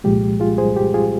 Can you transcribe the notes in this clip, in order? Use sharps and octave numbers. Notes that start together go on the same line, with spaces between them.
C2 A#2 F3 G#3 G4
F4 G#4
G#4 C5
G4
F4 G#4